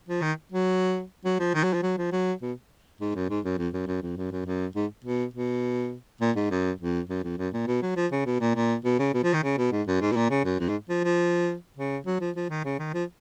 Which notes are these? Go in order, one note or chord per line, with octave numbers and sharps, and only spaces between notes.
F3
D#3
F#3
F#3
F3
D#3
F#3
F3
F#3
F3
F#3
B2
G#2
F#2
G#2
F#2
F2
F#2
F#2
F2
F#2
F#2
F#2
G#2
B2
B2
A#2
G#2
F#2
F2
F#2
F2
F#2
A#2
B2
F#3
F3
C#3
B2
A#2
A#2
B2
C#3
B2
F3
D#3
C#3
B2
G#2
F#2
G#2
B2
A#2
C#3
F#2
F2
G#2
F3
F3
C#3
F#3
F3
F3
D#3
C#3
D#3
F3